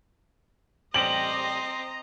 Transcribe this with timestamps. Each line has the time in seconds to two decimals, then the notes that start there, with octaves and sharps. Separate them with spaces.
0.94 A1 G3 C4 G4 D#5 A#5 F#7